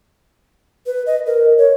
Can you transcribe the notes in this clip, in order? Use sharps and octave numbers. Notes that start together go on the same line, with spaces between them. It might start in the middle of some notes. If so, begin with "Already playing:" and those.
B4
D#5
A#4
C#5